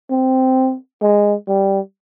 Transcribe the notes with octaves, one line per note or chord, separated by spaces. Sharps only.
C4
G#3
G3